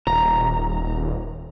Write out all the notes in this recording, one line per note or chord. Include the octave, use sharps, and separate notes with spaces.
D#1 A#5